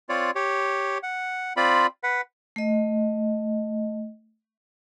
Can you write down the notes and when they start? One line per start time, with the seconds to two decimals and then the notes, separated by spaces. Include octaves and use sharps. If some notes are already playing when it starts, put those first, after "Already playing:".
0.09 C4 F4 C#5 D5
0.35 G4 C#5
1.03 F#5
1.57 C4 F4 D5 B5
2.03 B4 F#5
2.56 A3 D#5